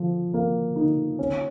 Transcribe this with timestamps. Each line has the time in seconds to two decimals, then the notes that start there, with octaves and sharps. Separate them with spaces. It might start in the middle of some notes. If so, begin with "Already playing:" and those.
Already playing: F3
0.34 A#3
0.76 D#4
1.19 C#4